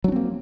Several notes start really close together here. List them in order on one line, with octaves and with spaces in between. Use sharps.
F#3 D4 C4 A#3